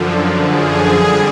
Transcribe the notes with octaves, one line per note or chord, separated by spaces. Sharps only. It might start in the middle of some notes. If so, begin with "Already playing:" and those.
Already playing: F#2 D3 F3
G#4
F2 D3 G3